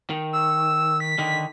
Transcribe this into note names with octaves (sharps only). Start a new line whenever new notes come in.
D#3
E6
B6
D3 D#3